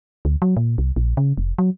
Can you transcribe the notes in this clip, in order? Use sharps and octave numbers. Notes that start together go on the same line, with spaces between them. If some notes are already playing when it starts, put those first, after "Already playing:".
D2
F#3
A#2
C2
A#1
C#3
F1
F#3